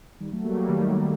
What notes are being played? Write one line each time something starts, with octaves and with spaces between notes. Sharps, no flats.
D#3 G3
F#3 A3
G3 A#3
F#3 A3
D#3 G3